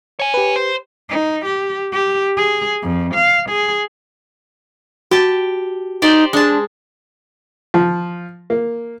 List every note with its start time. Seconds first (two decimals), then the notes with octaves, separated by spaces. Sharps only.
0.20 C#5 G#5
0.34 G4 B4
0.56 C5
1.09 D#4
1.45 G4
1.92 G4
2.37 G#4
2.83 F2
3.14 F5
3.50 G#4
5.11 F#4 G4 A5
6.02 D#4 G4 C5 D5
6.33 G#3 D4 A5
7.74 F3
8.50 A#3